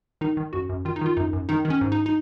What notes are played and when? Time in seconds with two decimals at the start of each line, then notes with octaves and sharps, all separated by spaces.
0.21 D#3 D#4
0.37 D#3
0.53 F#2 F#4
0.69 F#2
0.85 D#3 F4
0.96 D#4
1.01 D#3 F4
1.17 F#2 D#4
1.33 F#2
1.49 D#3 D#4
1.65 D#3
1.70 C#4
1.81 G#2
1.92 D#4
2.06 D#4